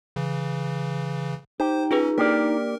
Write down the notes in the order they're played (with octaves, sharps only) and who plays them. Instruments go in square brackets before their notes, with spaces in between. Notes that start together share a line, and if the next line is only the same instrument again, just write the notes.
[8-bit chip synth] C#3 E3
[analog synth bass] D#4 [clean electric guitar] G4 [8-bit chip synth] C5
[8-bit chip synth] C#4 [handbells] F4 G#4 B4
[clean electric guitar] A#3 G4 D5 [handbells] D4 [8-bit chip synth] A#4